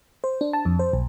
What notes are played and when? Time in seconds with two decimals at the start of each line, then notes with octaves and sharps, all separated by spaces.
0.24 C5
0.41 D4
0.53 A5
0.65 F2
0.79 C5
0.93 B1